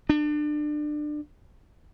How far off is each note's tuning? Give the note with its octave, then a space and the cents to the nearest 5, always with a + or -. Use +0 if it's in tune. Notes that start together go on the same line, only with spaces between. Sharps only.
D4 +25